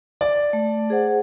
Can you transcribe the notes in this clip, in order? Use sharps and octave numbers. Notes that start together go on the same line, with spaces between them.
D5
A3
G#4 C5 F#5